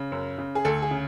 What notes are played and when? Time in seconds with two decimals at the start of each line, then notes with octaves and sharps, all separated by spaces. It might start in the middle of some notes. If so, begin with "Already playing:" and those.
Already playing: C#3
0.12 F#2
0.38 C#3
0.55 G#4
0.65 D2 A4
0.82 G#4
0.91 C#3